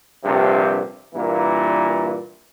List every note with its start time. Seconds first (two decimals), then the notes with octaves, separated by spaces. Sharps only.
0.24 A#1 G2 C3
1.15 G2 A#2 E3 A#3